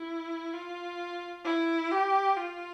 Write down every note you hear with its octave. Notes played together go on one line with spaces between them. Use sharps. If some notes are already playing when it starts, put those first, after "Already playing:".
Already playing: E4
F4
E4
G4
F4